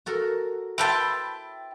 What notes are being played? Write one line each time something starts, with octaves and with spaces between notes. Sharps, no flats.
F#4 A4 A#4
E4 B4 C5 G5 A5